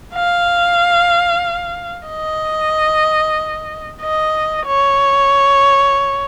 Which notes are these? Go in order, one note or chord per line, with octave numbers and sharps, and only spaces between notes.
F5
D#5
D#5
C#5